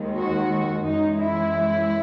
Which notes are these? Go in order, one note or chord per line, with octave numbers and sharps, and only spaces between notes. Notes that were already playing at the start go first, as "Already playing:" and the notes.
Already playing: D#2 D#3 G#3
F#4
F#2 E3 G#3 D#4
E4